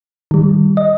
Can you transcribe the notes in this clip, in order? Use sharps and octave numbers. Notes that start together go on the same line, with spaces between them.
D#3 G3
D#5